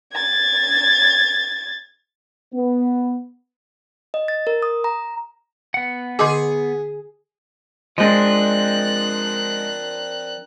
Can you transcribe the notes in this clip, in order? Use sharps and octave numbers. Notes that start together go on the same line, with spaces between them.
G#6 A6
B3
D#5
A6
A#4
D#6
A#5
B3 F#5
D3 G#4 D#5 D6
F3 G#3 C4 D4 A#4 D#5 F#6